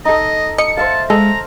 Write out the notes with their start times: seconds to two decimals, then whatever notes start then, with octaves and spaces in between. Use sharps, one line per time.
0.05 D#4 A4 D#5
0.58 D#5 C#7
0.77 C5 E5 F5 A5
1.10 G#3 A4 A#5